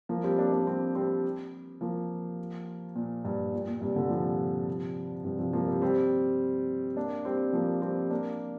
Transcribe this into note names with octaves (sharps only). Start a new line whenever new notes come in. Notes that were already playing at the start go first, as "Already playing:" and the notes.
F3 A#3
G3 C4
A#3 D4
A#3 D4
G3 C4
G3 C4
F3 A#3
A#2
G2
A#2
A#2
G2 C3
A#2 D3
C3 F3
G2 C3
C3 F3
F3 A#3
G3 C4
G3 C4
A#3 D4
G3 C4
F3 A#3
G3 C4
A#3 D4